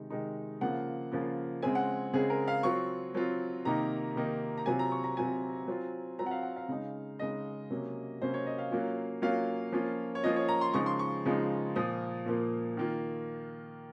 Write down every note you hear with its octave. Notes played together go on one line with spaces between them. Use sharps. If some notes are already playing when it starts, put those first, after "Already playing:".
Already playing: C3 D#3 G#3 D#4
C3 D#3 G#3 D#4
C#3 F3 A#3 F4 F#5
C#3 F3 A#3 F4
C#3 G#3 C4 G#5
F#5
C#3 G#3 C4 G#4
A#4
F5
F#3 C4 F4 C#6
F#3 C4 F4
C3 D#3 A#3 D#4 A#5
C3 D#3 A#3 D#4
A#5
C3 F#3 C4 F4 G#5
A#5
C#6
A#5
C3 F#3 C4 F4 G#5
F#3 C4 F4
F#3 C4 F4 A#5
F#5
F5
F#5
F5
C#3 G#3 D#4
C#3 G#3 D#4 D#5
C3 F#3 A#3 C#4
C3 F#3 A#3 C#4 C5
C#5
D#5
F5
F#3 A#3 C#4 F4
F#3 A#3 C#4 F4 F5
F3 A#3 C#4 F4
C#5
F3 A#3 C#4 F4 D#5
C#5
A#5
C6
C#3 F3 G#3 D#4 C#6
C6
C#6
C#3 F3 G#3 D#4
A#2 F3 A#3 D#6
A#2 F3 A#3
D#3 A#3 F4